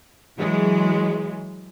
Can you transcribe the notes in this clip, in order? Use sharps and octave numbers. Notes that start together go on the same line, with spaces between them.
E3 F#3 G#3